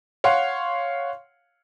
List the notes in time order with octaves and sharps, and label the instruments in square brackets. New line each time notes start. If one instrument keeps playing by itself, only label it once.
[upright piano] C#5 F5 F#5 C6